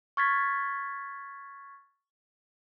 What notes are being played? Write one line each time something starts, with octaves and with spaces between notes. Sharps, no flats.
C#6 F6 G#6 A6 B6